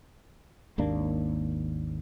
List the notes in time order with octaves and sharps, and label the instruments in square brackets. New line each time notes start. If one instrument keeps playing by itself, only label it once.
[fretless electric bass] G#1 D#2 A#3 D4